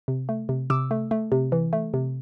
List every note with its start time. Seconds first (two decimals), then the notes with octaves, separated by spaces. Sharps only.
0.08 C3
0.29 A3
0.49 C3
0.70 C3 D6 E6
0.91 A3
1.11 A3
1.32 C3
1.52 E3
1.73 A3
1.94 C3